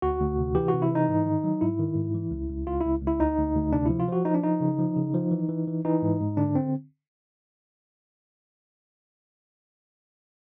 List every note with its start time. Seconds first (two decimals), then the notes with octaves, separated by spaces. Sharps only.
0.02 D2 F#4
0.20 D2
0.38 C3
0.55 E3 G4
0.68 C3 F#4
0.82 E4
0.91 E3 D#4
1.09 G#2
1.26 D#3
1.44 F#3
1.61 G#2 E4
1.79 D#3
1.96 G#2
2.15 E3
2.31 C#2
2.49 C#2
2.67 C#2 F4
2.81 C#2 E4
3.02 C#2
3.07 E4
3.20 D2 D#4
3.37 D2
3.55 D2
3.72 C3 D4
3.86 F3 E4
4.00 F4
4.08 F3 F#4
4.25 F3 D#4
4.35 D4
4.43 F3 D#4
4.60 C#3
4.79 F3
4.96 C#3
5.14 F3
5.31 E3
5.49 E3
5.67 E3
5.85 E3 D#4
6.02 G#2
6.20 G#2
6.37 D3 D4
6.55 C4